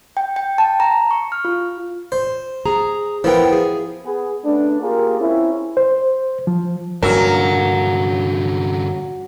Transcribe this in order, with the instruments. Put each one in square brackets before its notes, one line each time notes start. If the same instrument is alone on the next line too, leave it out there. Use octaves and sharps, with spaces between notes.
[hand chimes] G5
G5
A5
A#5
C#6
F6
F4
[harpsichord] C5
[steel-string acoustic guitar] G#4 A#5
[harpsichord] F3 B3 [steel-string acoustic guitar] E4 A#4 G5
[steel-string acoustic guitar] G#4
[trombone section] B3 G#4
A3 B3 C#4 D4
A#3 F4 G4 G#4 A#4
C4 C#4 E4
[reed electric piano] C5
F3
[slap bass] G2 A#2 F3 [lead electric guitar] D3 C#4 [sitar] F#3 [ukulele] A#4